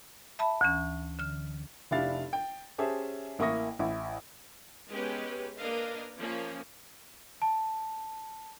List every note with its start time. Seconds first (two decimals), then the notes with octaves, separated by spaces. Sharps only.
0.39 E5 A5 B5
0.61 D2 E3 C#4
1.19 D3 F6
1.91 F1 D4 E4 G4 F5 A6
2.33 G5
2.78 C#4 G4 G#4 C5 E5 A5
3.39 A1 A#3 E4 C#6 D#6 A#6
3.79 A1 E4
4.90 G#3 B3 C#4 G4 B4
5.58 A#3 D4 A#4 B4 D#5 F5
6.18 F3 A#3 C#4
7.42 A5